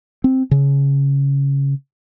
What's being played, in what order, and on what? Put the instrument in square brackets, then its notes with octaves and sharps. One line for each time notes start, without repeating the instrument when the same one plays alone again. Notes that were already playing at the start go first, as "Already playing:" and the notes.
[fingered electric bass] C4
C#3